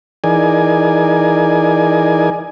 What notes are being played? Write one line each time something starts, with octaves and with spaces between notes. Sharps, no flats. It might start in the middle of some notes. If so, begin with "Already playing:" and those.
E3 D#4 G#4 A#4 D5 G#5